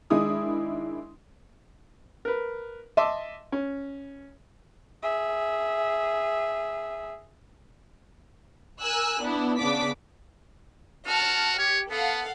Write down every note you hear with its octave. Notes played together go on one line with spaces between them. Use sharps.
D#3 G#3 D4 E4 D#6
A#4 B4
D#5 E5 A5 C6 D6 E6
C#4
G#4 E5
A#4 G#5 E6 F#6
B3 D4 E4
C#3 B3 D4 D5 D6 B6
F#4 A5 F6
G4 C#5
B3 A4 F5 F#5